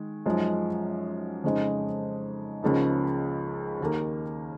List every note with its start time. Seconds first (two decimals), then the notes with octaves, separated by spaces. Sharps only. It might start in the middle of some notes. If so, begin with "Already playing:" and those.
Already playing: D#3 G#3
0.26 F#2 F3 G#3 D#4
1.44 F2 C#3 G#3 D#4
2.63 C#2 C#3 F3 A#3 D#4
3.81 D#2 D#3 A#3